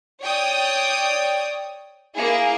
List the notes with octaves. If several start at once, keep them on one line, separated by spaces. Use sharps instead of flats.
C#5 D5 G5 D#6
A#3 E4 G#4